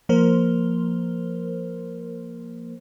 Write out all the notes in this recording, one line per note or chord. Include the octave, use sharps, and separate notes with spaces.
F3 A#3 A#4 C5